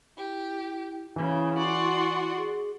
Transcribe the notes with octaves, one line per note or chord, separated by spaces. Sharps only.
E4 G4
C#3 E3 E4
F#4 D5 C6
G#4